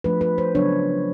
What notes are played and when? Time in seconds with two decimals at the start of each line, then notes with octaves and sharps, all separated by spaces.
0.04 F3 A3 D4 B4
0.21 B4
0.38 C5
0.55 C#3 F#3 B3 D4 C#5